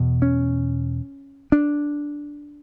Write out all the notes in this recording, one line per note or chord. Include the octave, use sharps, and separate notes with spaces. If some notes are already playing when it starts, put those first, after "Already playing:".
Already playing: E2 B2
C#4
D4